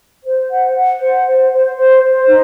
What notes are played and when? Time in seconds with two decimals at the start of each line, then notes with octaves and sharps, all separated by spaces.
0.24 C5
0.50 F#5
0.75 F#5
1.00 C5
1.26 C5
1.52 C5
1.77 C5
2.03 C5
2.28 D#4